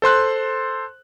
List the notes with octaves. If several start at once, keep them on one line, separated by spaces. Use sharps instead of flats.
A4 C5 C6 F#6